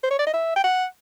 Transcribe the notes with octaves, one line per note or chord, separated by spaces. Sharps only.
C5
C#5
D5
D#5
E5
G5
F#5